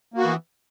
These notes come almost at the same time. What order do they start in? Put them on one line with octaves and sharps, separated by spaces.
A#3 F#4 B3 E3